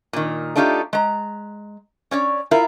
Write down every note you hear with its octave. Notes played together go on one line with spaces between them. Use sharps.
A#2 D#3
A3 D4 D#4 F4 G4
G#3 A#5
C#4 C#5 D5
E4 F4 A#4